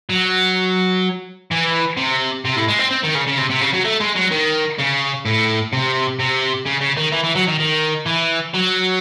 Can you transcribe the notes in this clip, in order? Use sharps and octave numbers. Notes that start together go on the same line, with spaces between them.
F#3
E3
C3
C3
A2
G#3
C4
C4
D#3
C#3
C#3
C3
C3
C#3
F#3
A3
G#3
F#3
D#3
C#3
A2
C3
C3
C#3
C#3
D#3
E3
E3
F#3
D#3
D#3
E3
F#3